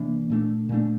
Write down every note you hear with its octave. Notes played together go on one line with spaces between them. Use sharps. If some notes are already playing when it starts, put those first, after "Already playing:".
Already playing: C3 E3 A#3 D4
A#2 A3 D4
A#2 A3 D4